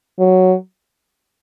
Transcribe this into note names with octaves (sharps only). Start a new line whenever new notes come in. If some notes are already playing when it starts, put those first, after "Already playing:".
F#3